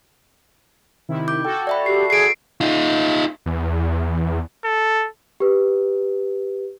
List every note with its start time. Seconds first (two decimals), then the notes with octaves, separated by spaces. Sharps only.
1.09 C3 D#3 E4
1.28 D6 G6
1.45 F#4 A4 G5
1.67 D5 E5 B5
1.86 G4 C7
2.10 G#4 C7 D7
2.61 D#4 F4
3.46 E2
4.65 A4
5.40 G4 B4